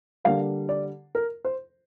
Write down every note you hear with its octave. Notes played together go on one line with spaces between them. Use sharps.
D3 G3 A#3 F5
D5
A#4
C5